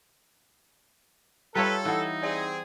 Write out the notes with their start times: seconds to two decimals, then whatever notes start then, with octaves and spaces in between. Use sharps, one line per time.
1.55 G3 F4 A4 B4 C#5 E5 A#5
1.85 E3 D#4 E4 F5 F#5
2.23 C4 G#4 D5 E5 G5